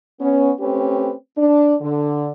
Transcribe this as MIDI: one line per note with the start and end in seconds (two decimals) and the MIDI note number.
0.20 0.51 59
0.20 0.51 61
0.60 1.13 57
0.60 1.13 60
0.60 1.13 61
0.60 1.13 67
0.60 1.13 71
1.37 1.73 62
1.81 2.30 50